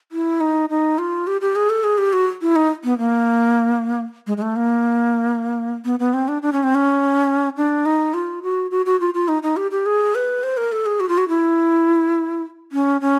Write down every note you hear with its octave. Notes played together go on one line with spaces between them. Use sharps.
E4
D#4
D#4
F4
G4
G4
G#4
A4
G#4
G4
F#4
E4
D#4
B3
A#3
G#3
G#3
A3
A#3
B3
B3
C4
D4
D4
C#4
C4
C#4
D4
D#4
F4
F#4
F#4
F#4
F4
F4
D#4
D#4
G4
G4
G#4
B4
C5
A#4
A4
G#4
F#4
F4
F#4
E4
C#4
C#4